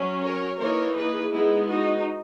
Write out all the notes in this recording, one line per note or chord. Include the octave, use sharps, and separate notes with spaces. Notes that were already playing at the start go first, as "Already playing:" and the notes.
Already playing: F#3 C#4
A#4 C#5
E3 A#3 D#4 A#4 C#5
G#4 B4
G#3 B3 D#4 E4 G#4
D#4 F#4